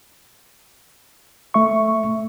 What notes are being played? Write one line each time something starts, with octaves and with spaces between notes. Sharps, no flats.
A3 E5 C#6